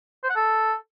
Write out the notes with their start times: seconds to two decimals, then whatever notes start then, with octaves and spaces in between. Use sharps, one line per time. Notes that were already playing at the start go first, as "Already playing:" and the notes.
0.23 C5
0.30 F#5
0.36 A4